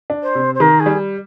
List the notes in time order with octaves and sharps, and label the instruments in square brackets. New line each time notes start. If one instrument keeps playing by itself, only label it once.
[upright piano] D4
[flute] C5
[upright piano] C3
[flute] C5
[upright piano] D#3 [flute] A#4
[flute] G#4
[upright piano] G3